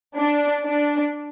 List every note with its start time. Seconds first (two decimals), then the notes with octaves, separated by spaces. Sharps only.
0.16 D4
0.66 D4